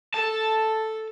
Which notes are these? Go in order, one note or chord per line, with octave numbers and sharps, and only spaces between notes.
A4 A5